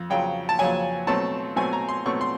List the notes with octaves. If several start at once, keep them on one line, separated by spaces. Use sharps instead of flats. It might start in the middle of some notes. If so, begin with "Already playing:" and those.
Already playing: F2
F2 C#3 F#3 G5
A5
F2 C#3 F#3 G#5
B2 F#3 A3 C4 A5
B2 F#3 A3 C4 G#5
A#5
C6
B2 F#3 A3 C4 C#6
C6